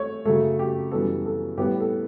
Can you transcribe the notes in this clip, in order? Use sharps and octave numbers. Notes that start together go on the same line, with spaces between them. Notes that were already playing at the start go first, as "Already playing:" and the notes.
Already playing: A3 C#5
F#2 C#3 F#3 A3 A4
G4
F#2 E3 G3 B3 A4
A4
A2 G3 B3 G4
A4